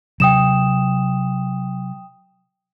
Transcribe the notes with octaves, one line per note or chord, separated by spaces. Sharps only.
C3 F#3 G5 D#6 E7